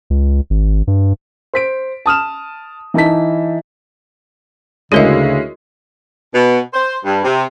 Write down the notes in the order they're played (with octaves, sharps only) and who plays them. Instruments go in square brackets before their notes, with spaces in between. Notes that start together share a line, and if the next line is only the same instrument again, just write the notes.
[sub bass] C#2
G#1
G2
[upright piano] C5 B6 D7
A5 D#6 F6 E7
E3 D#4 E4 A5 B6
[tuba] D2 [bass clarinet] C#3 [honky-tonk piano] G#3 C#4 E4 [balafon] F#4 A#4 D#5
[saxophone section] B2
C5
G2
C3